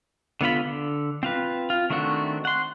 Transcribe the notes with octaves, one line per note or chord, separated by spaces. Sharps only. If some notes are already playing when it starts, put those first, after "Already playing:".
D3 B3 F4 B5
D3
C4 F4 B4
F4
D#3 A3 C4 D4 F#4
F#5 C6